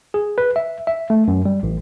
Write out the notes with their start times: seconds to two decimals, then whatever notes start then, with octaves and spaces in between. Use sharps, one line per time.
0.14 G#4
0.38 B4
0.56 E5
0.87 E5
1.10 A3
1.28 F#2
1.46 G3
1.63 A1